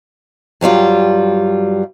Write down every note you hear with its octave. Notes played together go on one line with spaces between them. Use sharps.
G2 F#3 G3 F4